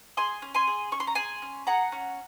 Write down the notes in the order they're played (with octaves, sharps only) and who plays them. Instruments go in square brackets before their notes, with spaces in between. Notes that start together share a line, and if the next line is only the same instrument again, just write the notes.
[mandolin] G#4 G#5 C6
C#4
G#5 C6
G#4
C#4 C#6
C6
A#5
G#4 G#5 C6
C#4
G#4 F#5 A#5
C#4